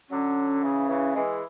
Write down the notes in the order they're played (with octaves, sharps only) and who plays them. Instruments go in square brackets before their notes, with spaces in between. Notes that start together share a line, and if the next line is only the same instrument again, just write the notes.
[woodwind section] D3 F#3 [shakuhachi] C#4
[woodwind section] C#3 E3
C#3 E3
E3 G#3